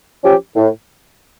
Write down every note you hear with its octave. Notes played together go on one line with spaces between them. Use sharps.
F3 C#4 G4
A2